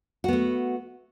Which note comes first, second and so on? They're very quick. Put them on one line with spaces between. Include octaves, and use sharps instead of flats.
F#4 B3 A3